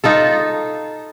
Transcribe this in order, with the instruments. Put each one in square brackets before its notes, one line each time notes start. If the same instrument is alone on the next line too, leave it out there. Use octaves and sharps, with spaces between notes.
[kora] D#4 F4 A4